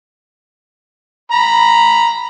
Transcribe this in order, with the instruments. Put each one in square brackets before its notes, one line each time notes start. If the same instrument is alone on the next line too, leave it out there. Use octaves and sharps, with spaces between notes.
[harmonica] A#5 B5